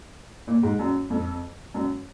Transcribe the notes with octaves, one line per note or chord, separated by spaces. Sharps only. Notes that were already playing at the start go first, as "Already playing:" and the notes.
A#2
G#2
F#2
F2
F#2